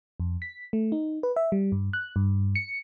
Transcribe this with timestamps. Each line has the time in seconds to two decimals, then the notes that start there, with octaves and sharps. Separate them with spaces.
0.20 F2
0.42 B6
0.73 A3
0.92 D#4
1.23 B4
1.36 E5
1.52 G3
1.72 G2
1.93 F#6
2.16 G2
2.55 C#7